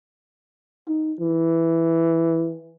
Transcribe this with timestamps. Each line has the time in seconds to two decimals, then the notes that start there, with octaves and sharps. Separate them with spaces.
0.88 D#4
1.19 E3